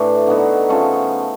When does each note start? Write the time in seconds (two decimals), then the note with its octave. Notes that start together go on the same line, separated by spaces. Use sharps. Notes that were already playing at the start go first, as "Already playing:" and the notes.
Already playing: A2 E3 A3 D4 E4
0.27 D3 F#3 B3 D#4
0.69 C#3 F3 A3 A4